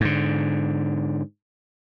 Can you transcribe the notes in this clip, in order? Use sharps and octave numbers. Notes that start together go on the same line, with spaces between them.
G#2 D3